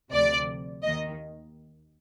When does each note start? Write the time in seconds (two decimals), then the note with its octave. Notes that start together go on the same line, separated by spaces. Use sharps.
0.12 D2 C3 F3 D5
0.83 D#2 D#3 D#5